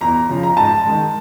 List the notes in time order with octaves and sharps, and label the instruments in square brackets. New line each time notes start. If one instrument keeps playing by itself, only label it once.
[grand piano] E2 A#5
C#3 F3
A#5
G#2 A5
D#3 G#3